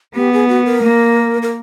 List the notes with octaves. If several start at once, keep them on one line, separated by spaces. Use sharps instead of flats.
B3 G4
G#4
F#4
A#4
A#3
A#4